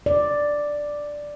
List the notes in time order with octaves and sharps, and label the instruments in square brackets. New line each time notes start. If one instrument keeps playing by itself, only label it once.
[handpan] D5